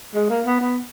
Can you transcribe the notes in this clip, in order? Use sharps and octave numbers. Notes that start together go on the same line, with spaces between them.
G#3
A#3
B3
B3